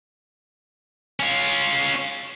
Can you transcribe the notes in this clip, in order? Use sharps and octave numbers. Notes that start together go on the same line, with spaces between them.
C#4 F4